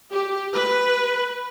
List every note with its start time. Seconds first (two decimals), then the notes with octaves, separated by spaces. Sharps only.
0.12 G4
0.54 B4